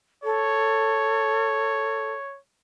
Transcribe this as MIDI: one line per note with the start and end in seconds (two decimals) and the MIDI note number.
0.24 2.11 69
0.24 2.39 73